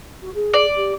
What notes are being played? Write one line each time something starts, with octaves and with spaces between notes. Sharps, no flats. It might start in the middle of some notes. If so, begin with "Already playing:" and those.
F#4
G#4
D5
G4